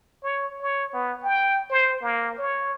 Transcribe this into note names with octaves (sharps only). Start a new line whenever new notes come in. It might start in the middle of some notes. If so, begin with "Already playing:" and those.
C#5
C#5
B3
G5
C5
A#3
C#5